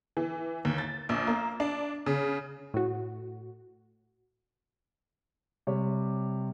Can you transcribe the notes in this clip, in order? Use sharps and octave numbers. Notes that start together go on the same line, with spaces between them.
E3
D#2
A6
A#1
A#3
D4
C#3
A2 F#4
C3 G3 C#5